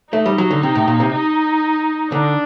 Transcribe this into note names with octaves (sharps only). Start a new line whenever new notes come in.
A3 D#4
G3
F#3
D3
C3
A2
A#2
C3
D#4
D3 D4